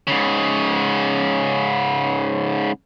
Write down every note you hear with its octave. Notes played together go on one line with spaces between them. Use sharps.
G#2 C#3